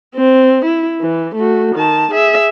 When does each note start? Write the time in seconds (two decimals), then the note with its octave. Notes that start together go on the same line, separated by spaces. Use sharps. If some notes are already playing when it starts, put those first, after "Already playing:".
0.15 C4
0.65 E4
1.01 E3
1.35 A3 F#4
1.75 D#3 A5
2.12 G#4 E5